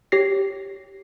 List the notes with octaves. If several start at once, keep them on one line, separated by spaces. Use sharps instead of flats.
G4 C#5 A#6 C7